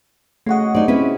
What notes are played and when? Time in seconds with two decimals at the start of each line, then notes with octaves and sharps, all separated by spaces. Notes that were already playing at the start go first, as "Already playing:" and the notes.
0.46 C#3 A3 F#4 D#5 F#5
0.60 G#4
0.75 C3 D#4 D5
0.88 C4 C#4 E4 B4